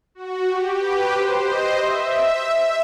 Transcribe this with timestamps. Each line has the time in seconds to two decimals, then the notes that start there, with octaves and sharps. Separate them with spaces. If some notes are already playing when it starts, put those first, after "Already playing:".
0.15 F#4
0.48 G4
0.79 B4
1.12 C5
1.43 D#5
1.75 E5